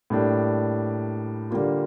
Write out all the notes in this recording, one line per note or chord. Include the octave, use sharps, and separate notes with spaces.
A2 G3 A#3 D4
D3 G3 A#3 F4